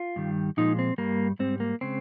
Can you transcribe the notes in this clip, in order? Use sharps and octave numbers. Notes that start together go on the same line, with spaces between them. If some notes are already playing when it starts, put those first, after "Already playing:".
Already playing: F4
G2 D#3 G3
A#2 F3 G#3 D#4
C4
G2 G3 A#3
G#2 G3 C4
A#3
C#3 G#3 C4